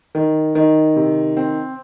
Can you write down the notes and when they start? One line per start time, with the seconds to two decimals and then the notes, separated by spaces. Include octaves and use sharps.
0.15 D#3
0.55 D#3
0.96 C3
1.37 C4